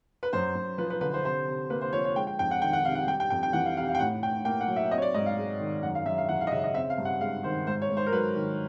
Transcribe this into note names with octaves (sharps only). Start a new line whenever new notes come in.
B4
F#2 C5
F#2
F3 B4
B4
D3 B4
C5
C3 C5
C3
A#3 B4
C5
F3 C#5
C#5
G#3 G5
G5
F2 G5
F#5
D#3 G5
F#5
C3 F5
F#5
G3 G5
G5
F2 G5
G5
E3 F#5
F5
C3 F5
F5
G5
A2 F#5
A2 G5
A#3 G5
F#5
F#3
E5
C4 D#5
C#5
D5
G#2 D#5
F5
G#3
D#3
F#2 F#5
F5
F#2 E5
F5
E3 F#5
F5
D#5
C#3 E5
D#5
C4 E5
F5
G2
F#5
G#3 F5
D#3 C5
G#2 C5
C#5
G#2
C5
A#4
F#3 B4
D#3